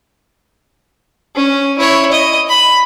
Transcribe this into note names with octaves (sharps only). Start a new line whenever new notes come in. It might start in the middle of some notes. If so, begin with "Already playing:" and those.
C#4
E4 C#5
D#5
B5